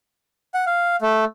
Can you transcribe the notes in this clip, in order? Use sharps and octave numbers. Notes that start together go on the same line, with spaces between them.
F#5
F5
A3